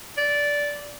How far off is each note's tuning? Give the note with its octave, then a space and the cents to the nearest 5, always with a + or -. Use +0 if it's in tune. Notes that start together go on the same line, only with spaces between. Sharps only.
D5 -10